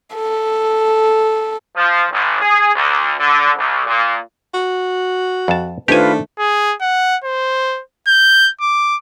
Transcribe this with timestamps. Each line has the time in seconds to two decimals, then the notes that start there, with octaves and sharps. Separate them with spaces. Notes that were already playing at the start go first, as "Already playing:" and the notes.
0.15 A4
1.76 F3
2.11 G#1
2.42 G#4
2.76 D2
3.20 D3
3.57 C2
3.86 A#2
4.54 F#4
5.48 F2 A5
5.88 D#3 A3 D4 F4 G4 B4 C5 G#5
6.39 G#4
6.81 F#5
7.24 C5
8.08 G6
8.61 D6